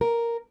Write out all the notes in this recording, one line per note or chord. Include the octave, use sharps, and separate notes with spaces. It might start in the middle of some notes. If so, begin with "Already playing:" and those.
A#4